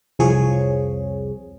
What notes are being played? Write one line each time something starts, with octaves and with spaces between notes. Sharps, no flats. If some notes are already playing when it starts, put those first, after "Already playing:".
C2 F2 F3 G#4 C#5